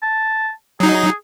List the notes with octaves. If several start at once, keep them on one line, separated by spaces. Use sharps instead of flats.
A5
F#3 D#4 G#4